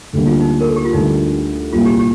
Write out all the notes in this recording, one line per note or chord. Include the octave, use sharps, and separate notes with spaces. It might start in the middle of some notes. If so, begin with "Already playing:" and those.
D2 D3 G3 A#3
F4
D#4
A#4
A4
G4
F4
D2 D3 G3 D#4
C2 A#2 G3 F4
G4
G4